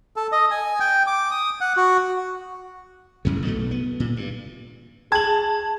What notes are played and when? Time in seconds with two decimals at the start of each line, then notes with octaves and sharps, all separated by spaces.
0.16 A4
0.32 D#5
0.51 G#5
0.80 G5
1.07 D6
1.31 D#6
1.61 F#5
1.77 F#4
3.25 A1 F#2 C#3
3.45 B1 B2 A3
3.71 B3
4.00 A#2
4.17 G2
5.12 G#4 A5 G#6 F#7